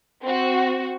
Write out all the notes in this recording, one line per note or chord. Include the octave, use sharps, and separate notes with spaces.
C4 F#4